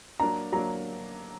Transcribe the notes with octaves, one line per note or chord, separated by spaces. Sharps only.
F#3 A#3 D4 A#5
F#3 A#3 D4 A#5